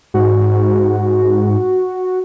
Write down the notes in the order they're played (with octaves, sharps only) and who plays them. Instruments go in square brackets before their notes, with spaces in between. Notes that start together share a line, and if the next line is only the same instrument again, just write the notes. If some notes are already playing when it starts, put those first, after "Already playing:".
[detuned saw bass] G#2 [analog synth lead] F#4